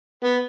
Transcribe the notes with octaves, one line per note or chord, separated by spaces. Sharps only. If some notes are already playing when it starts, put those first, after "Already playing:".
B3